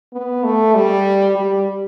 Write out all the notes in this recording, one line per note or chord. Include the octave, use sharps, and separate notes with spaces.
B3
A3
G3
G3